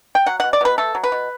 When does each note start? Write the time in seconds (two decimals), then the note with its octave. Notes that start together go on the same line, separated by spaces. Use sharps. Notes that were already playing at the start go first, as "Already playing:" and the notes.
0.15 G5
0.26 F#3 F#5
0.40 F#5
0.44 B2
0.53 D5
0.61 B2 B4
0.78 A3 A4
0.95 F#3
1.04 B4
1.12 B2